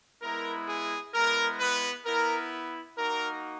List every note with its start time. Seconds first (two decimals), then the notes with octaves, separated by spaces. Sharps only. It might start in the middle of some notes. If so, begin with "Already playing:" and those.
0.22 G#3 B3 E4 A#4
0.68 G#4
1.14 G#3 B3 E4 A#4
1.60 B3 B4
2.06 B3 E4 A#4
2.98 A#3 D#4 F#4 A#4